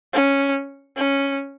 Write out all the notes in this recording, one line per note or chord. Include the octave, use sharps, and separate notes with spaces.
C#4
C#4